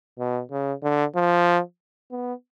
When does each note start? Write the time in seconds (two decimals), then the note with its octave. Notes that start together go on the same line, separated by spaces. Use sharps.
0.19 B2
0.51 C#3
0.83 D3
1.15 F3
2.11 B3